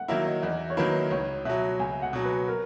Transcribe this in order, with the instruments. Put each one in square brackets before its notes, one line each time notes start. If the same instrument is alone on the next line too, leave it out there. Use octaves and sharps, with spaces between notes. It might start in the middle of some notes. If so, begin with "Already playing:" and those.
Already playing: [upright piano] F#5
[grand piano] D#3 F#3 A#3 E4 [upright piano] E5
[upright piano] D#5
[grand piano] E2 [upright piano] D#5
[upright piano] C#5
[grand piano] D#3 F#3 A#3 E4 [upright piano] B4
[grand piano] C#2 [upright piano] C#5
[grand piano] B2 F#3 [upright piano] E5
[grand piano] C#2 [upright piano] G#5
[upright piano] F#5
[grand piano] B2 F#3
[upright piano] B4
A#4